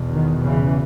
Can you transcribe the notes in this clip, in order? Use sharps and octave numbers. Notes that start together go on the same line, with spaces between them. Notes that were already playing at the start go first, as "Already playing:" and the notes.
Already playing: E2 B2
D#3
C#3 E3